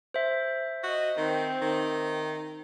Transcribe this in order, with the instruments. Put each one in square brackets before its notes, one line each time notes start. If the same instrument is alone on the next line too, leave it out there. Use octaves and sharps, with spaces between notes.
[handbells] C5 E5
[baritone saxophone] F#4 [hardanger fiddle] D#5
[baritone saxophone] D#3 [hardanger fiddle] C4
[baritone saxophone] D#3